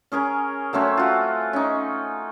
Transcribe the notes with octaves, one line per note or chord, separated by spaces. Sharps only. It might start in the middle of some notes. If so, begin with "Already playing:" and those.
C#4 G#4 A#4 C#5
F#3 A3 C4 C#4
F4 F#4
C#4 D#4